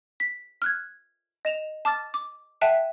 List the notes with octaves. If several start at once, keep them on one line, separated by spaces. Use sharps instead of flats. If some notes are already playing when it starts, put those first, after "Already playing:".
B6
F6 F#6 G#6
D#5 E7 F7
A5 D6 F6 A6
D6
E5 F#5 G5 A5 F#6 D#7